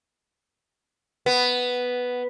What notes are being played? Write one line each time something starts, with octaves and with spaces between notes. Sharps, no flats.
B3